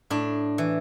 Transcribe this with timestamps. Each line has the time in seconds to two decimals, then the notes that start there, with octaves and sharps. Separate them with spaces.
0.10 A2 D4
0.58 E3